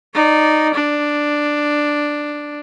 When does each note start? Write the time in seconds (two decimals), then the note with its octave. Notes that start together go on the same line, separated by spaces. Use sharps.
0.14 D#4 D5
0.74 D4